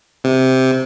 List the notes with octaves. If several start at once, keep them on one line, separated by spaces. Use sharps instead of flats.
C3